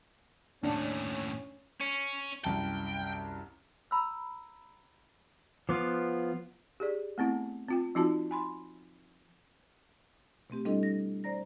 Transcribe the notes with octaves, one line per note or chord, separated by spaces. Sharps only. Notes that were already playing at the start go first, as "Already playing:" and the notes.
D#2 A2 C#4 D4
C#4
C2 F#2 G5 A5
A#5 B5 E6
F3 B3 F4 C6 D6 D#6
G4 G#4 D5
A3 B3 C4 E4
C4 F4 G5
F3 C4 D#4 F4 F#4 A5
G#5 B5 C6
B2 A3 C4 G4
G3 C4 D4 E4 A4 D#5
A#6
C5 D5 A#5 A#6